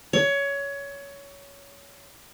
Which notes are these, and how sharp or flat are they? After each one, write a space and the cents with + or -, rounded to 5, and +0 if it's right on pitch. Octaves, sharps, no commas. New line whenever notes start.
C#5 +20